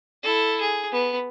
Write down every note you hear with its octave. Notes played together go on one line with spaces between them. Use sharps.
E4 A4
G#4
B3